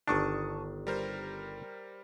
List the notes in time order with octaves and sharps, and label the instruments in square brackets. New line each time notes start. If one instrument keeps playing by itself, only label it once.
[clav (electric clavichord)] G1 D#3 D4 [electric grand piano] A5 C#6 D#6
[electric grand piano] G3 A#4 C5